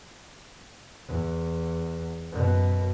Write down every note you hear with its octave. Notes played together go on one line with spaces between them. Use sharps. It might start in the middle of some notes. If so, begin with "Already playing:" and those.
E2
F#2 B2